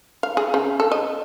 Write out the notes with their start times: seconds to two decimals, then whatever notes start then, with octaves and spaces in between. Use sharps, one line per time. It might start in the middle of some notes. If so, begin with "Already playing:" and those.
0.23 F5
0.37 G#4
0.54 C#3
0.80 A4
0.92 D#5